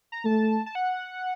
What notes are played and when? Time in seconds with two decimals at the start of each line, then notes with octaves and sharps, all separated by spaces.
0.12 A#5
0.25 A3 A5
0.66 A5
0.75 F#5